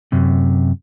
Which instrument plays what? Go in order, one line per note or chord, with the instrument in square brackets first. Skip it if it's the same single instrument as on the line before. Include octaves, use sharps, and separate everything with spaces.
[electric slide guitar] F#2 C3